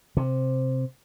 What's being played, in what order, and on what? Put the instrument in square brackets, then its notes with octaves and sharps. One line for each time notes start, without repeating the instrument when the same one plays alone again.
[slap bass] C3